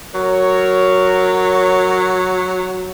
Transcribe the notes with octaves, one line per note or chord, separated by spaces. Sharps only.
F#3 A#4 C#5